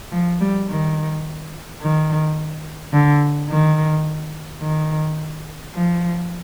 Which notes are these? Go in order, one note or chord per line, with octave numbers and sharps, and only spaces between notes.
F3
G3
D#3
D#3
D3
D#3
D#3
F3